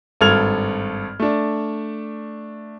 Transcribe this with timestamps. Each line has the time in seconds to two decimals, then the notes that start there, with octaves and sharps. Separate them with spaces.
0.21 G#1 G2 A4 F6 G#6 F7
1.20 A3 D4